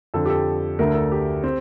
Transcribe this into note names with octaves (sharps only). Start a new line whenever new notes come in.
F2 D3 F3 A4
G4
A4
D2 D3 A3 A#4
A4
G4
C4